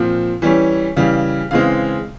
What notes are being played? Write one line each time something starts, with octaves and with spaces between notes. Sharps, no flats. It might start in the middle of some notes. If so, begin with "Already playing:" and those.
Already playing: A#2 F3 C4
E3 G3 C#4
C#3 E3 G3 F5
C#3 E3 G#3 C4 F5